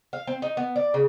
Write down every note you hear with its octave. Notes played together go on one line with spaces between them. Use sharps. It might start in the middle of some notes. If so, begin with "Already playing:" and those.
F5
C4
D#4
B3
D5
C#3